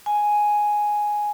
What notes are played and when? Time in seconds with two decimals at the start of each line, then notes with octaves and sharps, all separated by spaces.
0.06 G#5